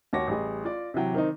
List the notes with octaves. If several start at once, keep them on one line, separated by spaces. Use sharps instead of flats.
D#2 F#4 C#5 D6 A#6
A1 G3 G#4
F4 D5
C3 E3 F#3 G5
D#3 C4 D#4